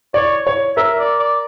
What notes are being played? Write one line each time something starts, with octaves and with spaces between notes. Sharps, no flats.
C#5 D5
C#5
A#4 E5
D5
D5